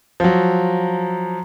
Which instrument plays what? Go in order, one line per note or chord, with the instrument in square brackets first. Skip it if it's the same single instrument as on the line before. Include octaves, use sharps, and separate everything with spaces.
[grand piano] F3 F#3